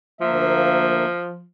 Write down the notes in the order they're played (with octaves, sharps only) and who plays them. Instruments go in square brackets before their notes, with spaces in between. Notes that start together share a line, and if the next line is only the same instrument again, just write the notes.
[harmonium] D2 A#3 E5 [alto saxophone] F3